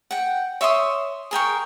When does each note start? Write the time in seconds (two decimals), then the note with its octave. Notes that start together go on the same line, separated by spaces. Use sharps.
0.11 F#5 G5
0.61 C#5 E5 C6 D#6
1.31 G#4 A#4 G5 C#6